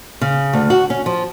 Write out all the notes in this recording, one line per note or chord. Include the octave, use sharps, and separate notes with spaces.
C#3
D2
F#4
C#4
F3